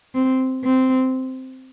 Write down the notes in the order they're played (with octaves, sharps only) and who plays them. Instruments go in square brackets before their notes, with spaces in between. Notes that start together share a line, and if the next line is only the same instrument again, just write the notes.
[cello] C4
C4